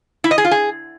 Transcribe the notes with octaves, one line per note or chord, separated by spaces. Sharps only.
E4
D#5
G#4
F4
G#4